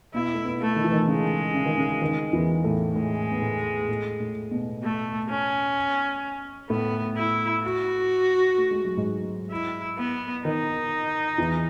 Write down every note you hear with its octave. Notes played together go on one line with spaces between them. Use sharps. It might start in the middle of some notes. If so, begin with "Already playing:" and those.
B2 B3 E4
A3
B2 B3
A3
D#3
E3
D#3
C#3 G#3
C#3
D#3
C#3
D#3
E2 E3
A2 A3
A2 G#3 A3
B3
A2 A3
A2 A3
A2 A3
B2 B3
A3
C#4
A2 A3 B3
E4
F#4
A3
G#3
F#3
G#2 G#3
E4
B3
D#3 D#4
E2 E3